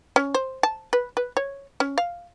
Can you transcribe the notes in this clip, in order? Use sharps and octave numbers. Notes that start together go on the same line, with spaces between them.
C#4
C5
A5
B4
B4
C#5
C#4
F5